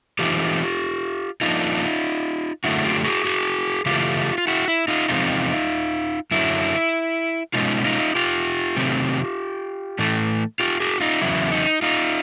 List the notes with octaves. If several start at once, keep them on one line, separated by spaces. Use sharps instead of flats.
A2 E3 A3 C4 D#4 F4 G4
D3 F3 A#3 D4 D#4 F4
F#2 D3 F#3 A3 E4 F#4
F4 G4
F#4 G#4
F#4 G#4
C#3 E3 A3 F4 G4
F4
E4 F#4
E4
D#4 F4
E2 C3 F3 G#3 C4 D#4 F4
F#2 D3 F#3 E4
B2 G#3 C#4 D#4 F4
D#4 F4
F4 G4
C3 D#3 F#3 A3 C4
A2 E3 A3
F4 G4
F#4 G#4
D#4 F4
E2 C#3 F#3 E4
D#4
D#4 F4